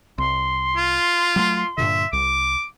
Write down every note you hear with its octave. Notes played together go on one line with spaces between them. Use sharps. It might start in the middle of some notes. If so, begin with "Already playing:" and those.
C2 C6
F4
F#3 G3 A3
G2 A#2 D3 E5
C2 D6